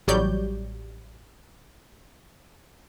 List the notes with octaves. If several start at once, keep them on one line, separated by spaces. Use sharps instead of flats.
A1 F#3 G3 C#5 D5 G6